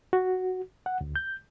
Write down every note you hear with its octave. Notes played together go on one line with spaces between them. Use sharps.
F#4
F#5
D2
G6